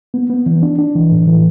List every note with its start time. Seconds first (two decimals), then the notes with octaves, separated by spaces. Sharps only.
0.14 B3
0.30 B3
0.46 E3
0.62 D4
0.78 D4
0.96 E3
1.11 A2
1.28 E3